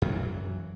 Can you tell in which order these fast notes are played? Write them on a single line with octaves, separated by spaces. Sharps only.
F#2 F#3 E3